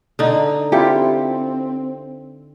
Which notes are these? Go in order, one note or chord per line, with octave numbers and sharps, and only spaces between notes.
D3 D#4
C4 E4 F4 G4